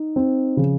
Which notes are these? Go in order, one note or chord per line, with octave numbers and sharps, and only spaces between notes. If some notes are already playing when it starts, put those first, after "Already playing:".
Already playing: D#4
C4
C#3 F3